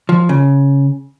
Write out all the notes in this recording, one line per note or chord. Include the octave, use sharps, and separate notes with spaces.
F3
C#3